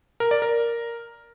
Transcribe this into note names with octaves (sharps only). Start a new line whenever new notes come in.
A#4
D5
A#4